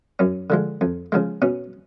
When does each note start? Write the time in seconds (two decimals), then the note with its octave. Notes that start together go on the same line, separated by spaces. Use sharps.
0.19 F#2 C#4
0.50 D3 F3 G#3
0.81 F2
1.12 C#3 F3 G#3
1.42 B2 C#4